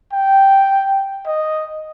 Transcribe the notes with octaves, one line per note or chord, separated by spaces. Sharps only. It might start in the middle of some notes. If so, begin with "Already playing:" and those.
G5
D#5